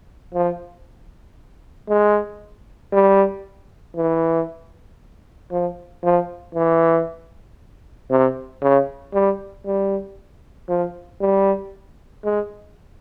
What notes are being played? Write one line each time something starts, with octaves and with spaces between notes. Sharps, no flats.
F3
G#3
G3
E3
F3
F3
E3
C3
C#3
G3
G3
F3
G3
G#3